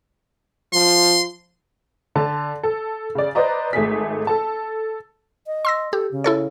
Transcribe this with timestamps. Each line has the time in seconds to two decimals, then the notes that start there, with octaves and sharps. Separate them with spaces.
0.73 F3 C6
2.15 D3 A5
2.63 A4
3.15 C#3 D5
3.35 B4 C5 D5 D#5 A#5
3.73 G#1 A3 G#4 B6
4.27 A4 A5
5.47 D#5
5.65 C6 E6 A#6
5.93 G4 A4
6.12 C#3
6.24 E4 A4 C#5